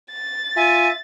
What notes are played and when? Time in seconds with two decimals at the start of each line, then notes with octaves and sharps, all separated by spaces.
0.12 A6
0.56 F4 E5 G#5